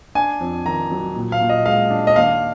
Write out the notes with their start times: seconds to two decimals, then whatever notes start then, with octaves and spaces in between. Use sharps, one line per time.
0.15 D4 G#5
0.40 F2
0.66 D#3 A#5
0.91 F#3
1.16 A#2
1.32 F5
1.41 A#2
1.49 D#5
1.66 G#3 F5
1.91 D4
2.07 D#5
2.16 D#2 F5